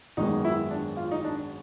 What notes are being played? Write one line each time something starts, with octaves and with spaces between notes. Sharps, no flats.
G#1 F#2 D#3 G#3 B3 D#4
E4
D4
F4
D#4
D4